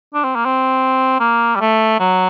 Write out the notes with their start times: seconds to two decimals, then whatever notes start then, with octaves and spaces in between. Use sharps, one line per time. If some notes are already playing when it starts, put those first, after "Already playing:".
0.14 D4
0.24 C4
0.35 A#3
0.46 C4
1.20 A#3
1.55 G3
1.60 A3
2.00 F#3